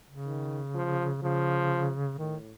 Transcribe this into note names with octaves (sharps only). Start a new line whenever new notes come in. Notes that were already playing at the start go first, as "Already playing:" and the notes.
C#3
D#3
F3
C#3 F3
A2 D#3